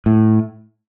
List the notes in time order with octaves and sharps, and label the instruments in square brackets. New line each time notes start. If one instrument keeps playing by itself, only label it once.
[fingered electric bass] A2